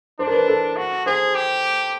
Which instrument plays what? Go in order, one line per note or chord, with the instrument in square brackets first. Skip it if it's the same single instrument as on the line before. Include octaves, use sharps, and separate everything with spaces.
[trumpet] D4 [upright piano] C5
[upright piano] A#4
B4
A4
[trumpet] F#4
[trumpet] G#4 [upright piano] C5
[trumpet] G4